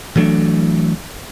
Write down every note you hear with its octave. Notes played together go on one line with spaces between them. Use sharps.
E3 F#3 A3 D4